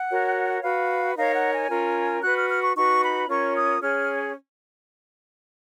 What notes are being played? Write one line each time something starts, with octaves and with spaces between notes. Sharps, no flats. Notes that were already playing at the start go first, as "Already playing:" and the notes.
Already playing: F#5
F#4 A#4 C#5
F#4 B4 F5
D#4 A#4 C#5 F5
F#5
G#5
C#4 F4 A#4
F#4 B4 F#6
F6
F6
C#6
D#4 F#4 B4 C#6
B5
C#4 F4 A#4 C#5 C#6
D#6
C#4 G#4 C#5 F6